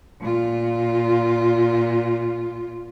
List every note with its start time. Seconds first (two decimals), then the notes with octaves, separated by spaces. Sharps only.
0.21 A#2 F4